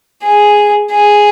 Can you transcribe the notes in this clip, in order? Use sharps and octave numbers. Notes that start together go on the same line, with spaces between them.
G#4
G#4